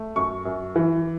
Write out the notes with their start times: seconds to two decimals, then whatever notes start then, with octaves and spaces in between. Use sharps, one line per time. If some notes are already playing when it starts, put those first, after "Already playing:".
Already playing: A3
0.16 F#2 C#6
0.45 F#2
0.76 E3